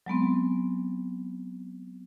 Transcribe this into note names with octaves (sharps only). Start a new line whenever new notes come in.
F#3 G#3 B3 C4